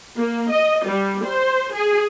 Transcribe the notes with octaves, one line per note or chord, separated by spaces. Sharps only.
A#3
D#5
G3
C5
G#4